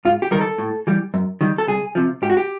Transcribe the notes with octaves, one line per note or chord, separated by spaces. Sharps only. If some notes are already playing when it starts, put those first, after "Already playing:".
G#2 F4
G4
D#3 G3 A#4
A4
A2
E3 G3
F#2
D#3 G3
A4
C2 G#4
C3 F3
G#2 G4
F#4
G4